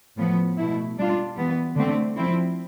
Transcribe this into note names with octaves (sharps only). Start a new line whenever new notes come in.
A2 F3 B3
B2 A3 E4
G3 D4 F4
E3 G3 B3
D3 A3 C4
F3 C4 E4